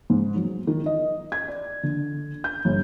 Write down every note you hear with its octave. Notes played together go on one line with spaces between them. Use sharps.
G#2
F#3
D#3
D#5
G#6
D5
D3
G6
G1